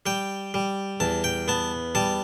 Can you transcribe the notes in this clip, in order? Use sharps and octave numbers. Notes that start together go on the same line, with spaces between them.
G3 G5
G3
E2 A5
G5
B3 A5
G3 A5